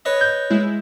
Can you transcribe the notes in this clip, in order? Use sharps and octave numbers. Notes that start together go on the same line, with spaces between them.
B4 C#5 D#5
G6
G#3 E4